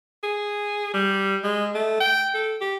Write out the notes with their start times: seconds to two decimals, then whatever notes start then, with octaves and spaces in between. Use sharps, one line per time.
0.24 G#4
0.94 G3
1.44 G#3
1.75 A3
2.00 G5
2.34 A4
2.61 G4